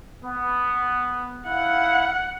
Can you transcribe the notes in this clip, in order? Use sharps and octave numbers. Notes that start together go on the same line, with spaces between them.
B3
E4 F5 F#5